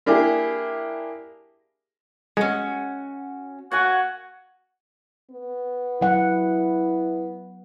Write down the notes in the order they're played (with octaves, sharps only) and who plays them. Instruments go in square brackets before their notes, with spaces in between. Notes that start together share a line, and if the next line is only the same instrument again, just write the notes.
[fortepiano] A#3 D4 E4 G4 G#4
[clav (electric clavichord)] G#3 [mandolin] C#4 F#4
[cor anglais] F#4 [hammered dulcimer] C#5 F#5 G#5
[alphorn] B3
[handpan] F#3 F#5 [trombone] E4